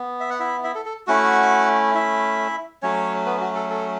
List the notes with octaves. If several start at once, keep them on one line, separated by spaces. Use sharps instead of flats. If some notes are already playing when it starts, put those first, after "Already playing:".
Already playing: B3
E5
F#5
E4 E5
E4 E5
A4
A4
A3 C#4 E4 F#4 F#5
E4 E5
F#3 A3 C#4 C#5
B3 B4
F#4
A4
A4